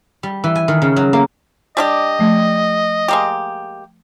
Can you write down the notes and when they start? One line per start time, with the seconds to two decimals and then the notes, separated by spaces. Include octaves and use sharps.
0.23 G3
0.44 E3
0.55 G#5
0.68 D#3
0.82 C#3
0.96 F#3
1.13 A#3
1.77 G3 D4 G4 D#5
2.19 F3 A3
3.08 G#3 A#3 G4